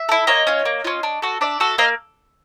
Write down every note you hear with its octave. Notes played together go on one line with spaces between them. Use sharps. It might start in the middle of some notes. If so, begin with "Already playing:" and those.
Already playing: E5
E4 A4
A#3 C#5 D#5
C#4 F4
A#3
C#4 F4
D4
F#4 A4
D4 D5 E5
F#4 A4
A#3 D#5 F5